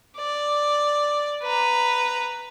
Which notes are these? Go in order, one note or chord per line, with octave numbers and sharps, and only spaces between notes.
D5
B4 A#5